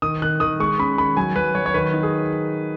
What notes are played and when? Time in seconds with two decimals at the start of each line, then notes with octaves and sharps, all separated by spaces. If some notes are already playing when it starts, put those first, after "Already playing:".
0.02 D#3 D#6
0.22 D#3 F#6
0.40 D#3 D#6
0.60 G#3 C#6
0.79 C#4 B5
0.98 D#3 B5
1.17 F#3 G#5
1.36 F#3 B4
1.55 F#3 C#5
1.66 C#5
1.74 D#3 B4
1.93 D#4
2.03 G#4